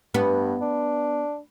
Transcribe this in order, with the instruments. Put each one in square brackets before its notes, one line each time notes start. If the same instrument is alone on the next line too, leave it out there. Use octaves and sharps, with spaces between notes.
[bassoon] G2 [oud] B3
[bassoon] D4